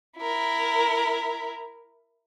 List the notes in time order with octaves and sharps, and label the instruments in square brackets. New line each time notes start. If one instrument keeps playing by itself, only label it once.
[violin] E4 A#4